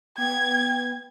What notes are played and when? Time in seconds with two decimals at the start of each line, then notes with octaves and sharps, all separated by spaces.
0.18 B3 G5 G#6